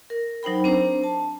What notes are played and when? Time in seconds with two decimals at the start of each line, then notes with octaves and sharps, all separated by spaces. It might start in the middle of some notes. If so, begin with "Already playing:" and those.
0.10 A#4
0.43 F#3 D#4 C5 G5 B5
0.64 C4 D4 C5 A#5
1.04 A5